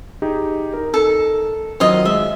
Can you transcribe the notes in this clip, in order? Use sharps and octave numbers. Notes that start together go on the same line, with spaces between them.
D#4 G4 G#4
D#4 A#4
A4
D#3 F#3 F4 C5 D#5
G#3 E5